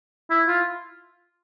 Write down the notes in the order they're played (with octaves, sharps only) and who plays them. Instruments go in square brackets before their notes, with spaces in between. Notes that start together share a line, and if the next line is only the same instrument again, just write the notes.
[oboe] E4
F4